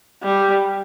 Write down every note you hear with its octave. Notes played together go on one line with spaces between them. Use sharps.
G3